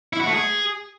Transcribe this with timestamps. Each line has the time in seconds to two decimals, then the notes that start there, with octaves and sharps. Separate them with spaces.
0.13 E4
0.20 F#4
0.27 A3
0.34 G#4